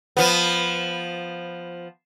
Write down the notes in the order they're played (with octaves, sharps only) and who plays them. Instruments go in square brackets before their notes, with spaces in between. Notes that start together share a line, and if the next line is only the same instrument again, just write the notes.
[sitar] F3 B3